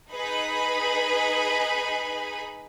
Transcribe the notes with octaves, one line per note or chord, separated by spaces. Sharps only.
D#4 G#4 B4 B5